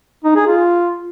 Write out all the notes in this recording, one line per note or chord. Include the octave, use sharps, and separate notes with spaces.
D#4
G#4
F4